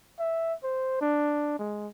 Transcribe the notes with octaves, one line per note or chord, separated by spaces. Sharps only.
E5
C5
D4
G#3